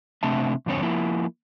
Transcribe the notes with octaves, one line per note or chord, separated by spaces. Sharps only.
C3 A3 C4 D4 E5 A5
F2 G#2 D3 C4 C#5
F3 A#3 E4